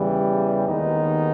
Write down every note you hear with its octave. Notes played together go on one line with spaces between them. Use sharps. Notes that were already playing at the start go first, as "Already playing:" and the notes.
Already playing: E2 C#3 E3 G3
D#2 D#3 G#3 B3 D#4